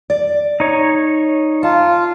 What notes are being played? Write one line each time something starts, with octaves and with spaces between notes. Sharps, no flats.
D5
D#4 C#5
F4 A5